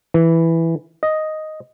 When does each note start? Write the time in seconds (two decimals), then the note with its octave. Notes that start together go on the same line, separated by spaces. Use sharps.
0.14 E3
1.03 D#5